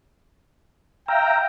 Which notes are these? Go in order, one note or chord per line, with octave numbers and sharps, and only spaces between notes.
E5 F5 G5 A#5